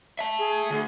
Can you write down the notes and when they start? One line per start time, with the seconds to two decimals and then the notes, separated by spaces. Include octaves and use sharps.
0.19 E5 A5
0.39 G#4
0.70 D2